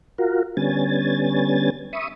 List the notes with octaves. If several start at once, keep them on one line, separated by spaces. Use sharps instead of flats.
F4 F#4 A#4
D3 G3 B3 C#4 G#5 A6
E5 B5 C#6 D#6